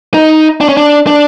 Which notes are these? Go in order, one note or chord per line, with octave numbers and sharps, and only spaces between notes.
D#4
D4
C#4
D4
D4